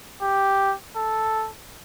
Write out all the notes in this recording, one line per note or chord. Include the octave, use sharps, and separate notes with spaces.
G4
A4